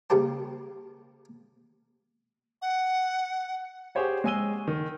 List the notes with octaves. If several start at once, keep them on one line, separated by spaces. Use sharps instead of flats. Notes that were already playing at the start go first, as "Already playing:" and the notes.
C#3 G3 A#3 G4 C5 A5
F#5
G4 G#4 C5 C#5 F#5
G#3 C#5 G#5 E6 D#7 G7
D#3